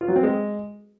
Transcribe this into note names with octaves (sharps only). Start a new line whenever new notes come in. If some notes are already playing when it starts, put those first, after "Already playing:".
F4
F#3
C4
G#3